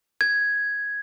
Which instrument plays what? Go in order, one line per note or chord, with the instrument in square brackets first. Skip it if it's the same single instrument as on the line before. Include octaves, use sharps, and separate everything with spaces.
[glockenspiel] G#6